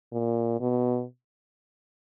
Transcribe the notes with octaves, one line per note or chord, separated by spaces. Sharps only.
A#2
B2